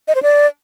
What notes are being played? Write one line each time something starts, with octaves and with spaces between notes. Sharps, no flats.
D#5
C5
D5